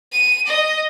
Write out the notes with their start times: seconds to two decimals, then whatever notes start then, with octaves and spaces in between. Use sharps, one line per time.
0.12 D#7
0.46 D#5